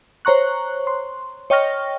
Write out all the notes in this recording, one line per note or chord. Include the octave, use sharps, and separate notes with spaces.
C5 C#5 A#5 C#6 F#6
C6
C#5 D#5 G5 C#6 F6 A#6